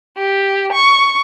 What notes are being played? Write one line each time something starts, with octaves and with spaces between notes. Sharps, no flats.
G4
C#6